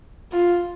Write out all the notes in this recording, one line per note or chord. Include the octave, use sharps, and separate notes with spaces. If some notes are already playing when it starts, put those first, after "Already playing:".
F4